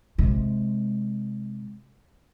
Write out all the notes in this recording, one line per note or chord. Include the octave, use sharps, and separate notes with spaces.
C3 G#3